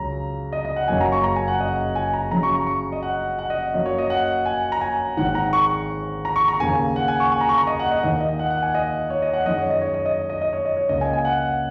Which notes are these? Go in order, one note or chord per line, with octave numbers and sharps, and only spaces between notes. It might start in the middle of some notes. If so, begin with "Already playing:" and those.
Already playing: C#2 C#3 F#3 A#5
D#5
D#5
F#5
F#1 F#2 C#3 F#3 A#3 G#5
A#5
C#6
A#5
G#5
F#5
D#5
G#5
A#5
F#2 C#3 F#3 A#5
C#6
A#5
C#6
D#5
F#5
F#5
D#5
F#2 F#3 A#3 D#5
C#5
D#5
F#5
G#5
A#5
G#5
G#1 G#2 D#3 G#3 F#5
A#5
C#6
A#5
C#6
A#5
D#2 C#3 A#3 G#5
F#5
G#5
C#6
G#5
A#5
C#6
A#5
D#5
F#5
D#5
D#2 D#3 A#3 D#5
D#5
F#5
F#5
G#5
D#5
C#5
D#5
F#5
F#2 D#3 G#3 D#5
C#5
D#5
C#5
D#5
D#5
D#5
D#5
C#5
D#5
C#5
C#2 C#3 A#3 D#5
G#5
G#5
F#5